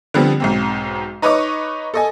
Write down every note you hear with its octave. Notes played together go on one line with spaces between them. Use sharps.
D3 F3 G3 B3 C4
B1 G#2 C4
D#4 B4 C#5 D#5 C#6 D6
A4 D#5 G#5